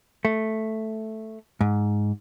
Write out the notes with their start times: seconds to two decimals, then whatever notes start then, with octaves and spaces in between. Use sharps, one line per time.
0.25 A3
1.61 G#2